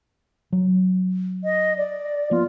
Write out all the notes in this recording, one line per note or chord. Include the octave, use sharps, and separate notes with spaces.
F#3
D#5
D5
F3 A#3 B3 F4